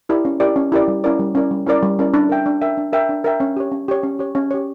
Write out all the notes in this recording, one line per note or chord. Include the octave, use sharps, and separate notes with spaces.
E4 G4 A#4 D5
C#4
E4 G4 A#4 D5
C#4
E4 G4 A#4 D5
G3
C#4 E4 A#4 D5
G3
C#4 E4 A#4 D5
G3
C#4 E4 A#4 D5
G3
C#4 E4 A#4 D5
D4
A#4 E5 G5
D4
A#4 E5 G5
D4
A#4 E5 G5
D4
A#4 E5 G5
C#4
G4 C#5
C#4
G4 C#5
C#4
G4 C#5
C#4
G4 C#5